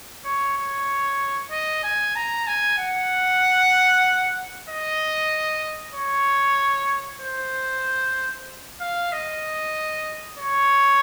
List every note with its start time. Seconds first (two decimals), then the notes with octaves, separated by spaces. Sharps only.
0.25 C#5
0.57 C#5
1.51 D#5
1.84 G#5
2.16 A#5
2.47 G#5
2.79 F#5
4.69 D#5
5.95 C#5
7.22 C5
8.80 F5
9.12 D#5
10.38 C#5